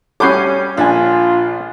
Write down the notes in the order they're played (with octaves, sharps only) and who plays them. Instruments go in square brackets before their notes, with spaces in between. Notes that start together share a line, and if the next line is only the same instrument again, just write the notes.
[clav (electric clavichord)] A2 F#4 [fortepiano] G3 C#4 [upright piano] D6 G6 C7
[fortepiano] A#1 G#5 [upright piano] D4 [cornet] F4